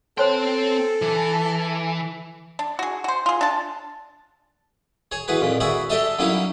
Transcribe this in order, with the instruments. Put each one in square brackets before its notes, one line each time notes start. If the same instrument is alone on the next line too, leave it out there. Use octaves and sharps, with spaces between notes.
[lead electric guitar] C4 G5 [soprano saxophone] A4 [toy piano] C5 C#5 C6
[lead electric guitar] E3
[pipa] D4
F#4 G#4
F#4 C5
F4 G#4
D4 A5
[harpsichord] G#4 C#5
E2 F#4 G#4 B4
F2 A#2
F#4 G#4 D5 E5 B5
D4 G4 A4 D#5 E5 A5
F#3 G3 A#3 C#4 D#4 E4